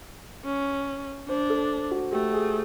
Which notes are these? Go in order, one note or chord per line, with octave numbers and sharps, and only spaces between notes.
C#4
D4 C5
A4
F#4
A3 G4
G#4